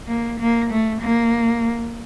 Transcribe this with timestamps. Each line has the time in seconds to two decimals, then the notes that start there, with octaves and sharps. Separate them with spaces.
0.08 A#3
0.40 A#3
0.70 A3
1.01 A#3